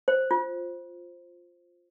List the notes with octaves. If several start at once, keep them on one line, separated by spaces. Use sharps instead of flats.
C5
F4